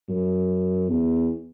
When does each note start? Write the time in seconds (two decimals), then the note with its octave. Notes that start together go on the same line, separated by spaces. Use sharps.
0.09 F#2
0.89 E2